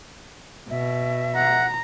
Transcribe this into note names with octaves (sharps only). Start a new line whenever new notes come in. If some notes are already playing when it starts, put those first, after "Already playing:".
B2 E5
F#5 A#5